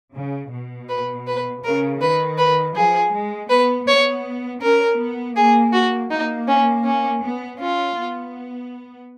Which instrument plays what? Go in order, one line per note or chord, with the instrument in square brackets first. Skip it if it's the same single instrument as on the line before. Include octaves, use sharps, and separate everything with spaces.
[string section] C#3
B2
[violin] B4
B4
[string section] C#3 [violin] A#4
[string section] D#3 [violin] B4
[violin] B4
[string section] F3 [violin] G#4
[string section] G#3
[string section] B3 [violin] B4
[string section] B3 [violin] C#5
[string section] C#4 [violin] A#4
[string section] B3
[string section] A#3 [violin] G#4
[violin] F#4
[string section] A#3 [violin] D#4
[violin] C#4
C#4
[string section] B3
[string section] C#4 [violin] F4
[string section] B3